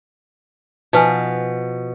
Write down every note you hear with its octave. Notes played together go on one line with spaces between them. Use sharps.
B2 F3 D#4 B4 G#5